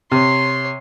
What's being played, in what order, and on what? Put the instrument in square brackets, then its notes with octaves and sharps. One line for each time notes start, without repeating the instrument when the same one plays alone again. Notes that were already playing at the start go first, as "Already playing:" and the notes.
[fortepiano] C3 [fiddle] C#5 C6